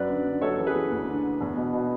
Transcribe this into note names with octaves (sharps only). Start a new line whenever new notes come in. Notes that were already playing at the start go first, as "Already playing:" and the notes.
Already playing: F#2 B4 D5
D3
D3
F#2 A4 C#5
E3
G#4 B4
E3
D2
D3
D3
E2
B2
B2